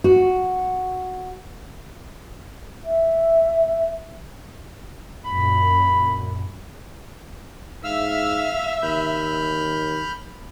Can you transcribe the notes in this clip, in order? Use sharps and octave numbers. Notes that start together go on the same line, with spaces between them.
F#4
E5
F#2 A#2 B5
G#2 E5 F5 E6 F6
D#2 B5 F6 G6